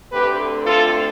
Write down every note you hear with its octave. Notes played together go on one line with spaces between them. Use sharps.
D2 D3 A3 C4 G4 B4
F4 A4